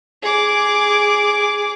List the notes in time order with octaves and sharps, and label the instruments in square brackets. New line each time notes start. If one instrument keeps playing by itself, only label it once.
[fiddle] G#4 D6